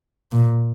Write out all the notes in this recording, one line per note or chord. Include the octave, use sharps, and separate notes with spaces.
A#2